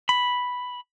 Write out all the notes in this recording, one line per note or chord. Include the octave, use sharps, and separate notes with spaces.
B5